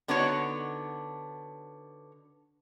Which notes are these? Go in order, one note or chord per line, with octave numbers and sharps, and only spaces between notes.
D3 B3 D4 D#4 F#4 C#5